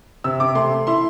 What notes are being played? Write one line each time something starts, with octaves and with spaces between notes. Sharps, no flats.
C3 E6
C3 D6
A3 C6
A3
E4 C6